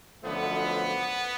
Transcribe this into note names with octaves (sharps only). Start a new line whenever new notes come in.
F#2 D3 F3 A3 B3